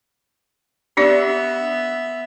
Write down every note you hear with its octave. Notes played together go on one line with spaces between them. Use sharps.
B3 D4 G4 D5 E5